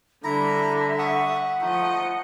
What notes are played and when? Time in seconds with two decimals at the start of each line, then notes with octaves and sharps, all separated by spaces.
0.24 D3 G3 E4 E5 A#5
0.99 F#5 C#6 D#6
1.61 F3 A3 D#4 D#5